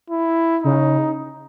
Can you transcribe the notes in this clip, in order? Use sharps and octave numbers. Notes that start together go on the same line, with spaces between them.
E4
C#3 D#4